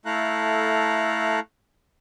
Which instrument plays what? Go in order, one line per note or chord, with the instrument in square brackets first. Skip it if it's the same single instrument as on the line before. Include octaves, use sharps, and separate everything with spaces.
[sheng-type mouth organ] A3 E4 A4 F5 A#5 F#6